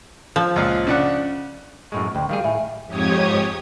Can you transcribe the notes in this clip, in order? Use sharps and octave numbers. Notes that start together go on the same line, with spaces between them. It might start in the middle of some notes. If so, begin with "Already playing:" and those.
F3
C#2 A#2 F5
C#3 D4 F#5
F#2 A2 G#3 C#6
D2 G5
D#3 G3 G#4 F5
A2 E5 G#5
F2 G#2 G4 C#5 D#6 G#6